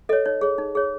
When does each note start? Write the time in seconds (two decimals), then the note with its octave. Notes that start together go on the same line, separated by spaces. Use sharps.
0.09 A4 C#5 D#5
0.25 D#4 C#5
0.41 G#4 C#5
0.58 D#4
0.75 G#4 C#5